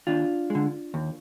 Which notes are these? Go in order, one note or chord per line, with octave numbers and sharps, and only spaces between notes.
D#2 D4 F4
D3 G#3
D#2